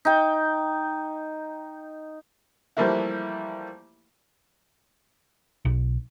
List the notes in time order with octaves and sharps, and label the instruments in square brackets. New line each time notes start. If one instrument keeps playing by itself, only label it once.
[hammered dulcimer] D#4 G5
[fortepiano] E3 F3 G3 A3 A#3 E4
[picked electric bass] B1